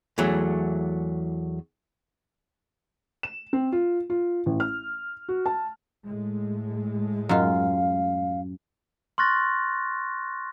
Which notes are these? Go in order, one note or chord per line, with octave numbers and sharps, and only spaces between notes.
E2 E3 F#3 A3
E7
C4
F4
F4
A1
F6
F#4
A5
A2 G#3 A3
F#2 F4 F5
C6 C#6 F6 F#6 A6 A#6